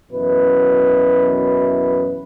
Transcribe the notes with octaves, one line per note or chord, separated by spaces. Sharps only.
F#2 B2 E3 E4 B4